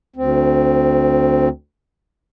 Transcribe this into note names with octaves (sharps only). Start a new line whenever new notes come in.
D2 C4